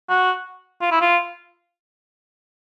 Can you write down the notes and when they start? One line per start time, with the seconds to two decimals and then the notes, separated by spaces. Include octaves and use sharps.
0.10 F#4
0.81 F4
0.91 E4
1.01 F4